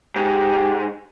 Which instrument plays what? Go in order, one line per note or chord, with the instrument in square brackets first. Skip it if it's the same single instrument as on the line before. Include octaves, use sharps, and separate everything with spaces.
[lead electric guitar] G#2 [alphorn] G4